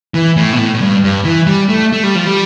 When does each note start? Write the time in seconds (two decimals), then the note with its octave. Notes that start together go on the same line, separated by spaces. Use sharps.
0.14 E3
0.37 A2
0.53 B2
0.58 A2
0.74 A2
0.81 G2
1.04 G2
1.25 E3
1.47 G3
1.69 A3
1.93 A3
2.03 G3
2.15 F3
2.27 G3